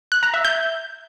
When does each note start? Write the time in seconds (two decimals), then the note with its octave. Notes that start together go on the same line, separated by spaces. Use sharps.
0.12 F#6
0.23 A#5
0.34 E5
0.45 G6